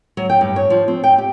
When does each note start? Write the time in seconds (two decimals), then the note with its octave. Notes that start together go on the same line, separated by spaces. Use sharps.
0.17 F#3
0.29 G5
0.41 G2
0.56 C#5
0.70 F3
0.88 C4
1.04 G5
1.18 G4